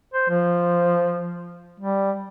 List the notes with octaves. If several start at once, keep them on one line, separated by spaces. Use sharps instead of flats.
C5
F3
G3